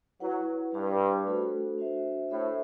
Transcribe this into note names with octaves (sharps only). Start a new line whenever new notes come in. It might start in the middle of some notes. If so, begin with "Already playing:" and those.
F#3 E4 B4 F#5
G2 D4 G4 B4
A3 D4 F#4 A4 C5
D4 F#4 C5 E5
A2 D4 A4 C5 E5